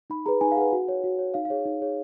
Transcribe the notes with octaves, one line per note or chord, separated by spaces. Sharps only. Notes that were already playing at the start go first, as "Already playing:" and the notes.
D#4 B5
G#4 B4 A#5
D#4 G#5
F5
G#4 B4 F#5
F#4
C#5
F#4
C#5
D#4 F5
F5
G#4 C#5
D#4
G#4 C#5